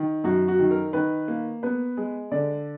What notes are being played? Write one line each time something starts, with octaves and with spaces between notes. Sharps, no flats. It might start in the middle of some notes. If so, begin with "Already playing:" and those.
Already playing: D#3
F#2 F#4
F#4
D#3
A#4
D#3 B4
A#3
B3 B4
G#3
D3 D5